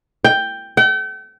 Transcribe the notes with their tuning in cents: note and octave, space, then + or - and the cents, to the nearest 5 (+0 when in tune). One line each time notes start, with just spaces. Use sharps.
G5 +5
G5 -40